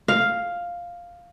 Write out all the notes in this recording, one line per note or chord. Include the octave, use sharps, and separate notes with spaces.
F5